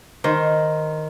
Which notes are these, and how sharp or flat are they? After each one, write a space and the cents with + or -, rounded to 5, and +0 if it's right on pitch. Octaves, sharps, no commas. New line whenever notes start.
D#3 +0 C5 +0